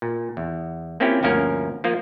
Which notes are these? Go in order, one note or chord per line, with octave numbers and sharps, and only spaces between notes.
A#2
E2
A#3 C4 C#4 E4 F4 G4
G1 D2 F3 A#3 C#4 A#4
F3 A#3 F4